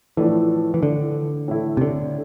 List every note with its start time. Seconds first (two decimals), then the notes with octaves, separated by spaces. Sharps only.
0.17 A2 E3 F3 A3 D4 A4
0.74 E3
0.83 D3
1.48 A2 E3 A3 E4
1.77 C3
1.81 D3